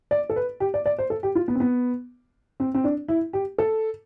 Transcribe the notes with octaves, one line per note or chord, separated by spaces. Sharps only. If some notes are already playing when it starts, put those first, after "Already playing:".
D5
A4
B4
G4
D5
D5
C5
A4
G4
F4
B3
C4
B3
C4
C4
D4
E4
G4
A4